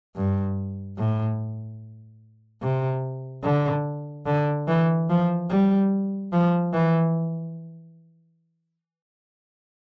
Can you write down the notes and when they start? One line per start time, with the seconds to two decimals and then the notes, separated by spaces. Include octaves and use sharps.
0.16 G2
0.98 A2
2.62 C3
3.44 D3
4.26 D3
4.68 E3
5.09 F3
5.50 G3
6.33 F3
6.73 E3